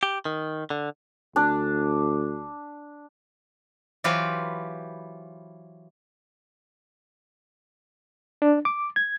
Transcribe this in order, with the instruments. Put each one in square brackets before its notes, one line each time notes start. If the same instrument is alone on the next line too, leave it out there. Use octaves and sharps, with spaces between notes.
[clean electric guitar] G4
D#3
D3
[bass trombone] D2 [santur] D4
[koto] E3 F#3 F4 G4 B4 C5
[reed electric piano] D4
D6
G#6